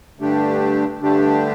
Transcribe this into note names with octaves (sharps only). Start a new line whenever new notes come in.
G2 D3 A3 D4 G4
G2 D3 A3 D4 G4